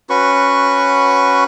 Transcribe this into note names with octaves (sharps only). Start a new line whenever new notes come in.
C#4 F#4 B4 C#6